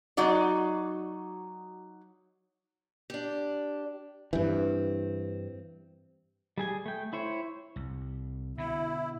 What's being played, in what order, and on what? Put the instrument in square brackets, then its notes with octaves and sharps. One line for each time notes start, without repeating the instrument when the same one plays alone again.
[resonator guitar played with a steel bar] F#3 D#4 F#4 D5
[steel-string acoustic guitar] D4 G4
[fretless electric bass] G2 E3 [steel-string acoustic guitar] C4
[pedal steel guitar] G3 G#4 G#5
A3 G5
E4 C5 C#5
[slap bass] C2
[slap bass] B2 D3 [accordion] E4